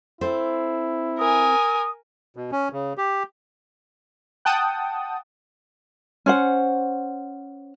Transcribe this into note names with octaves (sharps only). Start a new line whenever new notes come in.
C4 E4 A4 C5
A#4 G#5 D#6
B2
C#4
C#3
G4
F#5 G5 A5 D#6
C#4 C5 F#5